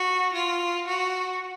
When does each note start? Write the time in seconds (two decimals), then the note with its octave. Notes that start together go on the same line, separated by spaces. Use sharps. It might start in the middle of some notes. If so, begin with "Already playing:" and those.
Already playing: F#4
0.34 F4
0.87 F#4